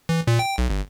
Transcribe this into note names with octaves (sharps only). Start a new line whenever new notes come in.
E3
A#2
G5
B1
G1